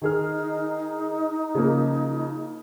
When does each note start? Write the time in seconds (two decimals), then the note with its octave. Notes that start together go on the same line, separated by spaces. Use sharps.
0.02 D#3 D#4 G#4 F6
1.55 C#3 F3 A#3